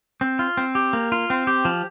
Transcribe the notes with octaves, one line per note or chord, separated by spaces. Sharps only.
C4
F4
C4
G4
A#3
F4
C4
G4
F3